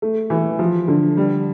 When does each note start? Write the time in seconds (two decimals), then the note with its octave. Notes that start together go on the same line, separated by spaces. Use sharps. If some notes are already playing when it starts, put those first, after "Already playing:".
0.02 A3
0.30 E3
0.59 F3
0.88 D3
1.17 G3